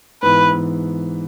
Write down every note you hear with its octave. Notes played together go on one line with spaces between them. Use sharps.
G#2 E3 B3 B4
E3 B3